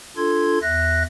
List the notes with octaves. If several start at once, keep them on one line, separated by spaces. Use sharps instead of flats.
D4 F4 A4 C6 G#6
E2 E5 F#6 A#6